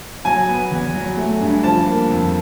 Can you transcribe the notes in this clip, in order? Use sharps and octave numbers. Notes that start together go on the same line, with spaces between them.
F#3 G#5
B3
E2
F#3
A3
G2
F3 A5
A#3
F2